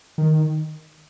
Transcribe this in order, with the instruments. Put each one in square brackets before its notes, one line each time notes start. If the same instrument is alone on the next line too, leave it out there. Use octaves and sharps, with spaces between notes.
[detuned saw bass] D#3